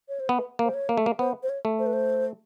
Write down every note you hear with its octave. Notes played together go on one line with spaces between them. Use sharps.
C#5
C5
B3 B4
A#3
C5
C#5
A#3
A3
A#3
B3 C5
C5
C#5
A3
C5
B4
C5